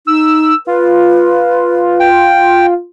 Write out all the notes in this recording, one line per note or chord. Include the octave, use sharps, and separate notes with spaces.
D#4 E6
F4 B4
G5